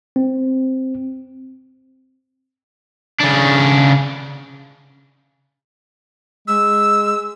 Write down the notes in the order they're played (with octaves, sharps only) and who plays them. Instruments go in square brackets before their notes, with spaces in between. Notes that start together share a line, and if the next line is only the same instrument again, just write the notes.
[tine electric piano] C4
[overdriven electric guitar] C#3 D4
[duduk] G#3 [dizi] E6